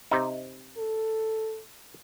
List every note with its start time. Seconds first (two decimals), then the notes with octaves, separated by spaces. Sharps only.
0.11 C3 D#4
0.78 A4